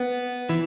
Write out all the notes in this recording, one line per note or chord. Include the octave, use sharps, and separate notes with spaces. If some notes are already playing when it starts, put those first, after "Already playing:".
Already playing: B3
E3